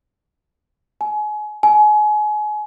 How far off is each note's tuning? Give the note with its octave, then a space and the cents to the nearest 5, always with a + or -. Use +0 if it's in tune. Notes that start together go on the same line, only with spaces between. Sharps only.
G#5 +30
G#5 +30